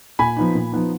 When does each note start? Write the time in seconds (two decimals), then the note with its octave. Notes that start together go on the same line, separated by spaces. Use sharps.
0.19 A#2 G#5 B5
0.37 F3 B3 D#4
0.55 A#2
0.72 F3 B3 D#4